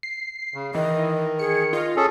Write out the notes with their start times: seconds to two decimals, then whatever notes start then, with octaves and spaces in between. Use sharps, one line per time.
0.03 C7
0.54 C#3
0.75 D#3 E3 D#5
1.39 G#4 C#7
1.73 F4 D#5
1.96 C#4 G#4 A4